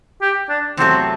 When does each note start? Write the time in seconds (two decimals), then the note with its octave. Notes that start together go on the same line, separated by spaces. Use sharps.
0.22 G4
0.49 D4
0.77 E2 C3 F#3 A3 C4